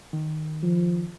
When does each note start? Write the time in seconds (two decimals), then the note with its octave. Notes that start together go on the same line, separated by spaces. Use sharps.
0.13 D#3
0.63 F3